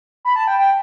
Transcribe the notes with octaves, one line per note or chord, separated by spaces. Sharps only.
B5
A5
G5
G5